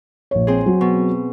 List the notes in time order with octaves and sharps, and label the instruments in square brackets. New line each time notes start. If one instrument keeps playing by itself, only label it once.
[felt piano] A#1 C#5
[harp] C4 G#4
[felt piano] F#3
[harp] B2